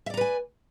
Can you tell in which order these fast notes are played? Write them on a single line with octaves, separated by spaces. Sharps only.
E5 D5 A#5 B4 G#5